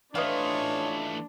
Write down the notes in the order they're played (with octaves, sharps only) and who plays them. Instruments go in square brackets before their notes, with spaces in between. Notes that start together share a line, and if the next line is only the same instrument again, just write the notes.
[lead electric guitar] E3 A3 [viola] D4 [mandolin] F4 B4 D#5 [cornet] C#5